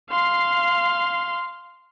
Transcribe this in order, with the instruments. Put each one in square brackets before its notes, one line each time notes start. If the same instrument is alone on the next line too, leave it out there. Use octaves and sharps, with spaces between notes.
[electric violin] F5 C6